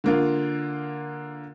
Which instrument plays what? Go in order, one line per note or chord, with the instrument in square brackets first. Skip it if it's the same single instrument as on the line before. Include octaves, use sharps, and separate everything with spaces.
[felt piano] D3 A#3 F4